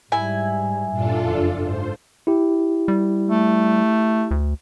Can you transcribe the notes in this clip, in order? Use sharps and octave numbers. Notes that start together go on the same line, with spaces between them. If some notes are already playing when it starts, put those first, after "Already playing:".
G#2 G3 E4 G#5
G2 A#2 D4 F4 A4
F#1 F2
G#2 C5
E4 G4
G3
A3
D2